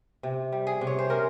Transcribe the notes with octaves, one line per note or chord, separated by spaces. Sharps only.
C3
G3
G#4
C3
C#5
C5
C#4 A#4